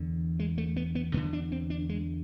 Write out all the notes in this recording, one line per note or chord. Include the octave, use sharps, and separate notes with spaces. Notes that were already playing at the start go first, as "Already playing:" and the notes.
Already playing: E2 D3
G#3
A3
B3
B3
E2 D3 B3
D4
C4
D4
G#3